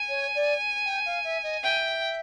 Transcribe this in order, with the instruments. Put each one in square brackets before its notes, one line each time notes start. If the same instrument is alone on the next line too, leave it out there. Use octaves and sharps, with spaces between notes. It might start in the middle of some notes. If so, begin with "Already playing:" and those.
Already playing: [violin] G#5
[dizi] C#5
D5
G5
F5
E5
D#5
[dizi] E5 [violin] G5